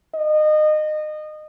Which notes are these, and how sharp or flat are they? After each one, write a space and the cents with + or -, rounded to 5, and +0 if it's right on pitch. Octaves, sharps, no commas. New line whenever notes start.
D#5 -25